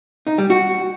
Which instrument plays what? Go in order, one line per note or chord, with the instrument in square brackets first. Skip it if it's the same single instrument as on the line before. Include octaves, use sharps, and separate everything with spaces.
[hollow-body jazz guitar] D#4
G3
F#4